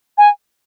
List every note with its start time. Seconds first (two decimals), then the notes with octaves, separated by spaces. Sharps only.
0.18 G#5